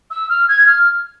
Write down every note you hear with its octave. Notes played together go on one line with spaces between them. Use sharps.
E6
F6
G#6
F6